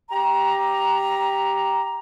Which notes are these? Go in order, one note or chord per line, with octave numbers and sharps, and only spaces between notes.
G4 A#5